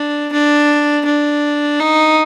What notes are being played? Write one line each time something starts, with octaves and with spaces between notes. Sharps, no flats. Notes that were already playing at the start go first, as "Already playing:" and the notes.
Already playing: D4
D4
D4
D#4